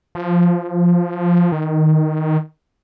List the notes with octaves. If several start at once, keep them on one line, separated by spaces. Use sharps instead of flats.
F3
D#3